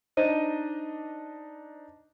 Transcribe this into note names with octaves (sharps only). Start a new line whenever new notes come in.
D4 D#4 C5 D#5 D#7